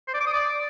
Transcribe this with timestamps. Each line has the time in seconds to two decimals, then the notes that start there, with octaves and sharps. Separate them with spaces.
0.08 C5
0.14 D5
0.20 D6
0.27 D#6
0.33 D5